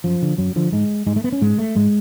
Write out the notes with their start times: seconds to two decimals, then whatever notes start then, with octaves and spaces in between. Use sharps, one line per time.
0.04 F#2 F3
0.22 D3
0.38 F#2 F#3
0.56 D3 F3
0.72 G#2 G#3
1.06 G#2 G#3
1.16 A3
1.24 B3
1.32 C#4
1.41 G#2 G#3
1.58 A3
1.75 G#2 G#3